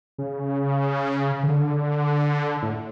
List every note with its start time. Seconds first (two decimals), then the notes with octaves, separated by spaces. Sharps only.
0.18 C#3
1.43 D3
2.62 A2